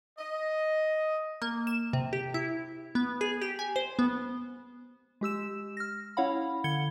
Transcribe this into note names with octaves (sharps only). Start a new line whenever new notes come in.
D#5
A#3
E7
C3
G4
E4
B3
G#4
G4
G#5
C5
B3
G#3 G4 E6 E7
F6 A#6
C#4 E4 C#5 F5 F#5 B5
D3 G#6 C#7 G7